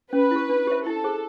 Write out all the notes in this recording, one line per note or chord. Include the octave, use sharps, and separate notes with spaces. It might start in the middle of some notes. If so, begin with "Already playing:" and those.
C#4 B4
E4 G4
D4
G4 C5 E5
E4 A4
G#4 C5